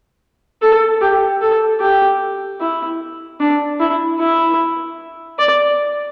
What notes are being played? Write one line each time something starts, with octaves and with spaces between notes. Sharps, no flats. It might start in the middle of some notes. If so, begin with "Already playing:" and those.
A4
G4
A4
G4
E4
D4
E4
E4
D5